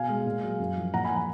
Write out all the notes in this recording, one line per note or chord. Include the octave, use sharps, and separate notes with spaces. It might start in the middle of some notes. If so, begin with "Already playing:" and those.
Already playing: B2 F5 G#5
G#3
A#2
F#3
F#2
F3
A#2 F#5 A#5
G#5 B5
F3
F#5 A#5